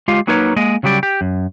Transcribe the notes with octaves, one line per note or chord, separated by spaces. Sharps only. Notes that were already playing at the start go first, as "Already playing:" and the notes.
G#3 F4 G4 F5
F#3 A#3 D#4 A#4 B4 C#5
G#3 A#3 D#5
C#3 F#3 G3 G4 D5
G4
F#2